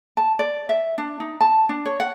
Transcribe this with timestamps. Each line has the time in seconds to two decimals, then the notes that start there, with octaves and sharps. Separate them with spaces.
0.17 A5
0.39 D5
0.69 E5
0.98 D4
1.20 D#4
1.41 A5
1.69 D4
1.86 C#5
2.00 F#5